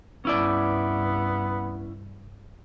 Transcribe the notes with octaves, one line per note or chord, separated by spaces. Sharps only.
C2 G2 B3 C#4 E4 D5